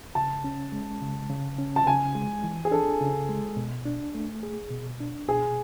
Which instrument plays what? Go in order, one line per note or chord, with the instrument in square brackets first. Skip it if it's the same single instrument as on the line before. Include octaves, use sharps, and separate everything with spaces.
[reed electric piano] C#3 [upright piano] A5
[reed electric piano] C#4
G#3
C#3
C#3
C#4
[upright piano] A5
[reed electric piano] C#3 [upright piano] G#5
[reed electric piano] G#3
E3
[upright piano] G#4
[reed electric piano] D4 [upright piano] A4
[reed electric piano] C#3
G#3
B2
D4
A3
G#4
B2
D4
[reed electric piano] B2 [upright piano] G#4